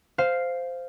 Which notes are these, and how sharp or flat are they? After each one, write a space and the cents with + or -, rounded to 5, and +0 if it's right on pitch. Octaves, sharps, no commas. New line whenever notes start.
C5 -10 F5 +0